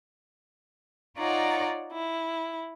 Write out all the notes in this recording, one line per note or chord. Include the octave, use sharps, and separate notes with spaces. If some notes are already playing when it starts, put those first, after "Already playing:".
D#4 F4 C#5 D5 F#5 A#5
E4